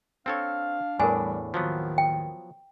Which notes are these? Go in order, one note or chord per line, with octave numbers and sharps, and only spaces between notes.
C4 D4 A4 C#5 F5
E2 A2 E3 G3 D4 A#4 G#5
D#2 A2 D#3 F3 F#3 B3
G5